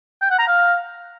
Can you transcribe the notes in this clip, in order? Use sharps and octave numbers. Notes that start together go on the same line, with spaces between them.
G5
F#5
A#5
F5